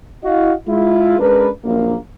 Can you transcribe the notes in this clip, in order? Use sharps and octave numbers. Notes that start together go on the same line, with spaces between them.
E4 F#4 D#5 F5
G#3 E4 F4
G#3 C#4 D4 A#4 B4
A#1 F#2 A#3